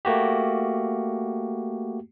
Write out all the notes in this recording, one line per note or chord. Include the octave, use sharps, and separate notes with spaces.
A3 A#3 F#4 G4